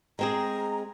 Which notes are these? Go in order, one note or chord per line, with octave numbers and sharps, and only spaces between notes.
G#3 C4 G#4 A#5